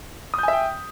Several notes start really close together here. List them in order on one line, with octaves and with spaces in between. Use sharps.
D#6 G6 G#5 E5 G5